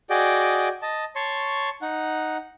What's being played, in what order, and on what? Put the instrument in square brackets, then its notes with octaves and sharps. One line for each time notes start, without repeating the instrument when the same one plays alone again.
[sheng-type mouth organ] F#4 G#4 D5 D#5 G5
D#5 A5
C#5 A5 C6 C#6
D#4 F#5